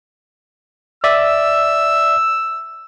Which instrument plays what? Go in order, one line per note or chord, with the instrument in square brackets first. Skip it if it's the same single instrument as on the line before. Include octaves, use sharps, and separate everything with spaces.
[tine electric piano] D5 E5 [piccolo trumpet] E6